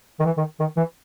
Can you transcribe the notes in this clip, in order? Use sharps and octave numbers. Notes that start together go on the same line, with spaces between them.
D#3
E3
D#3
D#3
E3